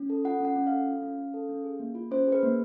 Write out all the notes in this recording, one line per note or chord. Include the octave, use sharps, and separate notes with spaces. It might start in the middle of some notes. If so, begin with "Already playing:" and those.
Already playing: C#4
A4
F4 F#5
C#4 F#5
C#4
F5
A4
F4
C#4
C#4
A4
C#4
G#4
A#3
F4
C#4 C5
G#4
B4
A#3